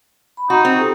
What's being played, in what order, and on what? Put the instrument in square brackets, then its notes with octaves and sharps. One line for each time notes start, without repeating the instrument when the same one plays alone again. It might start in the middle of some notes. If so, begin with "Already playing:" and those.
[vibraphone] B5
[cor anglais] D#4 [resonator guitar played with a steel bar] F#4 [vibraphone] A#5
[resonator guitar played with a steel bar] C4
[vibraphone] F4 G4 A4